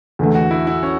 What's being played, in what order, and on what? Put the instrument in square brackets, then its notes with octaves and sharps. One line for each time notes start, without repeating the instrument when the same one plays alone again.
[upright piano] E2 D3 A3
[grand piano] F#4
E4
E4
C#4